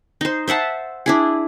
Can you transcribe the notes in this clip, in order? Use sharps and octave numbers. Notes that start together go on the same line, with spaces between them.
D#4 C5
C5 E5 F#5 A5
D4 E4 G#4